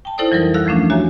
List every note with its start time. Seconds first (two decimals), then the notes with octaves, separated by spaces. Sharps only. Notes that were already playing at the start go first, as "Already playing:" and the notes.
0.05 G5 A5
0.18 D#4 E4 A4 C5 D5 D#6
0.31 F2 E3 F#3 G3 A#4
0.54 D2 A4 F5 E6 F#6 A#6
0.66 E3 F3 A3 C#4 D4
0.90 F#4 G4 C#5 E5 G#5 A#5